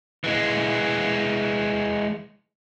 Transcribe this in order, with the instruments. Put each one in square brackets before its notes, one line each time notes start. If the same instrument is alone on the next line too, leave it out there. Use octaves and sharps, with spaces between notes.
[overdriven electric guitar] E3 G#3